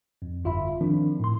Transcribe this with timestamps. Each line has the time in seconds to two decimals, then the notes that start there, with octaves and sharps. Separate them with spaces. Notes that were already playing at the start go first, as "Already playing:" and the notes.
0.22 F2
0.44 G1 F4 E5 B5
0.81 D#3 F3 C4 D4
1.20 A2 C6